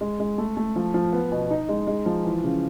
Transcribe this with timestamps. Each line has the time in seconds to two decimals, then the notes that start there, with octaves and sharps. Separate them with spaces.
0.01 G#3
0.20 G#3
0.38 A3
0.57 A3
0.76 F3
0.94 F3
1.13 B3
1.32 B2
1.50 D#4
1.69 G#3
1.87 G#3
2.06 F3
2.24 E3
2.44 C#3